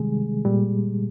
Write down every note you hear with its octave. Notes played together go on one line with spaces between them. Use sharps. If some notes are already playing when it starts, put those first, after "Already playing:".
Already playing: C3 D#3 G3 G#3 G#4
A#2 G3